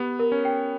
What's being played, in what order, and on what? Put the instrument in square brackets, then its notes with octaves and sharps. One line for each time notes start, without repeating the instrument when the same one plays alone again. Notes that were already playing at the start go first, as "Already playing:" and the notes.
Already playing: [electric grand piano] B3 [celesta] G4
[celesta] A#4
[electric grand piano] C#4
[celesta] G5